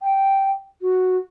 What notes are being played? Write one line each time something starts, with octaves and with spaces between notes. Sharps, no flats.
G5
F#4